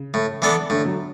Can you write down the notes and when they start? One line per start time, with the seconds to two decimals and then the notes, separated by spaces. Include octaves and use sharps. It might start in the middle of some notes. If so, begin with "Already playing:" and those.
Already playing: C#3
0.14 A2
0.42 E3 B3 D4 A4
0.70 A2 D3
0.85 F#3